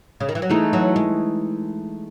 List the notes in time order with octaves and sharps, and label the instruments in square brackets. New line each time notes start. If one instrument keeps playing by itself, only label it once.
[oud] C#3
D#3
E3
F#3
[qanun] E3 A3 D#4 A4 [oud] G#3
[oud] F#3
G#3